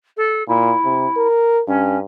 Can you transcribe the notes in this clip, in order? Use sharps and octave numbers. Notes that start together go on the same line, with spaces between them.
A4
A#2 E4
C3
A#4
G2 C#4